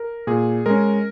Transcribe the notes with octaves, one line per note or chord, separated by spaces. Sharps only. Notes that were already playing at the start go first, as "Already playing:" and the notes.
Already playing: A#4
A#2 G#4
G#3 C#4 A#4